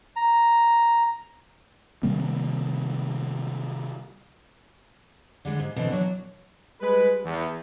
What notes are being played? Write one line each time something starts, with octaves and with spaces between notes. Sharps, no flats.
A#5
C3 D#3 G3 A#3
D3 G3 G#3
G#2
B2 D3 E3 C4
F#3 D4
G3 G#3 B4
E2